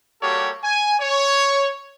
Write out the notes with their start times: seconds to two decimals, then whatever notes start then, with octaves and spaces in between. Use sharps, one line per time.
0.22 G3 A#3 F#4 G4 A4 C#5
0.64 G#5
1.00 C#5